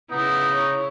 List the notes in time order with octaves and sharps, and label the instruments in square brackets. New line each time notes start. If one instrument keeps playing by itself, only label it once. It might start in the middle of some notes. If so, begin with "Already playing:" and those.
[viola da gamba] C#3 E4 [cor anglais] B3 [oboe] D#4
[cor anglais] C#5